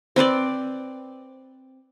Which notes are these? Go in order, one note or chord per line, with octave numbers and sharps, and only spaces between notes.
C4 B4 C5 D5